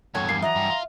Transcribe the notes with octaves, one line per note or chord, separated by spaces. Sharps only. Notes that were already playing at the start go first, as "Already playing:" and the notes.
E2 G2 F#4 A4 C#5 G#6
G3 A#3 C7
E3 F#3 D#5 E5 A#5
G2
F4